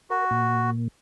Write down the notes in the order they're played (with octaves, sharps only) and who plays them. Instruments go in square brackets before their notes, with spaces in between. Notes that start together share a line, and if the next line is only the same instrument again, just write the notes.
[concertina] F#4 [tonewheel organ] A#4
[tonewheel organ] A#2